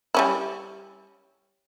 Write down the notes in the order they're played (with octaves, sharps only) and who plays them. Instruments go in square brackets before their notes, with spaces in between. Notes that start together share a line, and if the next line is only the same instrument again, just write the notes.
[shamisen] G3 C#4 E4